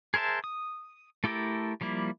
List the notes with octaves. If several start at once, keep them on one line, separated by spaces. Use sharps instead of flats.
G#4 A#4 C5 E5 A5
D#6
A3 E4 G4 A4 A#4
F3 G3 A#3 E4